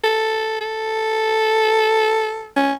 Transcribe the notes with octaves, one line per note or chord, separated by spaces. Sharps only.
A4
A4
C#4